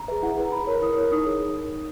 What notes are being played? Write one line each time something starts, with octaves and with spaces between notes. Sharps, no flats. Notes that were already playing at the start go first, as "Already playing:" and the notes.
Already playing: A#5
G#4 B4 E5
E4 F#5
G#4 B4 A#5
E4 B5
A#4 C#5
E4 D#6
A#4 C#5
D#4 D#6
G#4